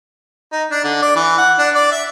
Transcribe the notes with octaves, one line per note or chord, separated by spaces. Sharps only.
D#4
D4
D3
D5
E3
F#5
D4
D5
E5